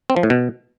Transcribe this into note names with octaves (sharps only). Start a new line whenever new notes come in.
C4
F3
A2
B2